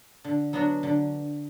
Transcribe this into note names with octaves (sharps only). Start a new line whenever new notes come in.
D3
F#3 B3 D4 F#4
D3